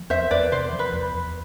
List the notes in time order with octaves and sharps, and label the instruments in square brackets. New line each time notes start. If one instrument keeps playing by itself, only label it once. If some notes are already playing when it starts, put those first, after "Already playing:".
Already playing: [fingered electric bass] F3
[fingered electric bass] E2 [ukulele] C5 E5
[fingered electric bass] E2 [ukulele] B4 D5
[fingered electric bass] C3 [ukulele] C5
[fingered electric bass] F3
[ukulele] B4
[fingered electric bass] E2
E2